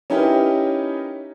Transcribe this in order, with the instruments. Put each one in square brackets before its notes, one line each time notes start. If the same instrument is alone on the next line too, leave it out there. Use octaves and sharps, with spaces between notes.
[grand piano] C#4 D#4 E4 G4 A#4 B4